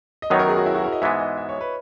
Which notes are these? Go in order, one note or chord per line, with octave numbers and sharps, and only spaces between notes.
D#5
F#2 D#3 F#3 B3 D#4 C#5
A#4
G#4
F#4
E4
F#4
A#4
D#5
G#2 E3 G#3 B3 E5
D#5
E5
C#5
B4